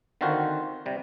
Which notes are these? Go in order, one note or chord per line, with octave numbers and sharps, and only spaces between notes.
D3 D#3 C4 F4 F#4 C5
C3 G3